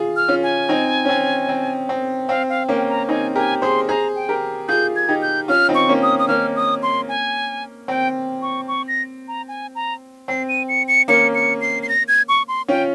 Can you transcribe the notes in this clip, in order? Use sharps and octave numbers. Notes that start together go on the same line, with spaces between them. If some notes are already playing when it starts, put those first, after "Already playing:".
Already playing: F4 G#4
F6
C#4 F4
G#5
C4 D#4
C#4
C4
C4
C4
C4 F5
F5
A#3 C#4 G5
A#5
C4 D#4 G#5
G4 A#4 G#5
G#4 C5 C6
G#4 C5 A#5
G5
G4 A#4
F4 G#4 G6
G#6
D#4 G4
G6
C#4 F4 F6
C4 D#4
C#6
A#3 C#4
D#6
D#6
A#3 C#4 F6
D#6
C6
G#5
C4 G5
C#6
C#6
A#6
A#5
G#5
A#5
C4 C7
D#7
C#7
C#7
A#3 C#4 C#7
C#7
C7
C7
A#6
G#6
C#6
C6
C#4 F4 G5